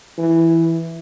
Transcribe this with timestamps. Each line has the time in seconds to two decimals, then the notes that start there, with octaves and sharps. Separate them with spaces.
0.18 E3